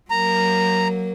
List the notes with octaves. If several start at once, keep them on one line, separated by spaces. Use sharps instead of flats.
F#3 A#3 A#5